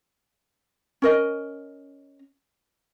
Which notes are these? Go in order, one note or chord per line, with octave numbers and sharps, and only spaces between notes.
C#4 A#4 D#5